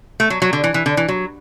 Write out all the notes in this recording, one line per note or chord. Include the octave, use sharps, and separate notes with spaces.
A3
F#3
F#3
D3
E3
E3
D3
E3
F#3